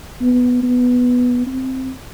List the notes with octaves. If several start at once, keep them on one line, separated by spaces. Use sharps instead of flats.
B3
B3
C4